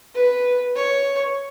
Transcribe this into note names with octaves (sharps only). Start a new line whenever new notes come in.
B4
C#5